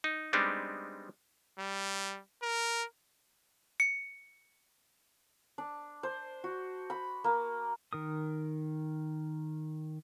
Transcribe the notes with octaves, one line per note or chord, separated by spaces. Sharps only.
D#4
G3 G#3 B3 C4 D4 D#4
G3
A#4
C#7
D4
C5
F#4
B5
A#3
D#3 A#4 D#6